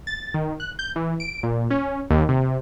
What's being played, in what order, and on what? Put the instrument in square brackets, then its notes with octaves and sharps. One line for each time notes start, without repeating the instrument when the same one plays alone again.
[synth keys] A6
D#3
F#6
G6
E3
D7
A#2
C#4
D#2
C3